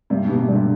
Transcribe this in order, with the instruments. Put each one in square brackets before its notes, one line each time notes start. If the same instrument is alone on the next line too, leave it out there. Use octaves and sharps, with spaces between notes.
[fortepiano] G2 [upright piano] C3
[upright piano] B2 [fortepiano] G3
[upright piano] C3
[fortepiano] G2 [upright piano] D3